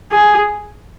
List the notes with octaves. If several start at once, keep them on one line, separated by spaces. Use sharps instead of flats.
G#4